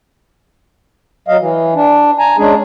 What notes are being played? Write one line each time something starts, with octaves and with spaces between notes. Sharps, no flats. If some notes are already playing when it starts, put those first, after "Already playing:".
F#3 D#5 F5
E3
D4
G#5 A#5
G#3 C#4 D4 G#4